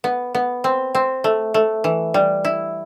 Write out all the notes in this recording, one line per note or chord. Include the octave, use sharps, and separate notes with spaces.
B3
B3
C4
C4
A3
A3
E3
G3
E4